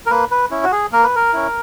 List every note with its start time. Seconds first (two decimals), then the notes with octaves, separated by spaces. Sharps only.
0.06 A#4
0.10 A#3 B4
0.31 B4
0.51 C#4 E4
0.64 F#4
0.72 G#4
0.92 A#3 A#4
1.04 B4
1.15 A#4
1.33 C#4 E4